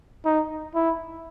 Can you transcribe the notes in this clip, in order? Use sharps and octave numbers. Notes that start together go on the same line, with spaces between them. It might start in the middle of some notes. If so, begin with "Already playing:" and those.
D#4
E4